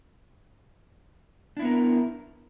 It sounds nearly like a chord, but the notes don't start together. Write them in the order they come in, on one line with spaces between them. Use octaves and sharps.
D4 E4 B3 A#4